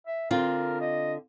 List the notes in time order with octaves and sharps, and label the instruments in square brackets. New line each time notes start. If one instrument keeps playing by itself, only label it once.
[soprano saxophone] E5
[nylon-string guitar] D3 C4 F4 [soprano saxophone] A#4
[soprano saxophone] D#5